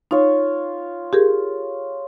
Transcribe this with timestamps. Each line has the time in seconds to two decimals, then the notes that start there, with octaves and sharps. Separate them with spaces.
0.11 D#4 F4 C#5
1.13 G4 G#4 A#4